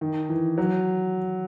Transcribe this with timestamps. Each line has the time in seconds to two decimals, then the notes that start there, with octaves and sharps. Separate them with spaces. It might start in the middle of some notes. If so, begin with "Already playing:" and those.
0.01 D#3
0.29 E3
0.58 F#3